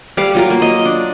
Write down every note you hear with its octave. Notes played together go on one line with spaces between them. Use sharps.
G3 F5 D6
F#3 F4 A#4
A#3
D#5
D4